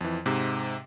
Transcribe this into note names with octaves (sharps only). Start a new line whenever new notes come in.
F2 E3
G#2 C3